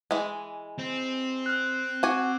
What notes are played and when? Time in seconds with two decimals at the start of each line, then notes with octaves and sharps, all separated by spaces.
0.11 E3 G#3
0.78 C4
1.46 F6 F#6
2.03 F#4 G#5 D6